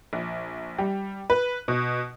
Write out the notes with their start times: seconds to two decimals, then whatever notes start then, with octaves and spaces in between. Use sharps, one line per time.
0.13 A#1
0.78 G3
1.30 B4
1.68 B2